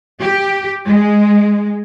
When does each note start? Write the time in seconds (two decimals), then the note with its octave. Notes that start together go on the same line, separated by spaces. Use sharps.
0.20 G4
0.87 G#3